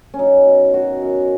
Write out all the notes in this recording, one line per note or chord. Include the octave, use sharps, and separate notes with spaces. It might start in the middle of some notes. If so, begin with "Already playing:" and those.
C#4
F#3 D#4
B2
D#3 F#4
F#2